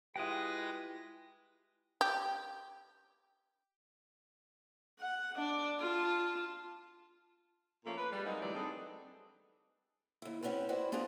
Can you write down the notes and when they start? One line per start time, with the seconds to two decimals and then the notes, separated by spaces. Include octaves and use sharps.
0.16 G#3 E4 F4 G4 B4 G5 D#6 A#6
2.01 G4
4.99 F#5
5.36 D4 D5
5.80 F4 A5
7.85 A#2 F3 A3 A#3 C#4 F4
7.97 B4
8.11 G3 G#3
8.25 F#3 G#3 A#3 C4 D#4
8.41 D2 G#2 E3 F#3 G3 D5
8.54 C4 D4 D#4 G#4 A4 B4
10.22 D#2 E4
10.43 C4 C#4 F#4 G4 B4
10.69 E4 F#4 B4 C5 D5
10.92 B3 D4 F4 G#4 A#4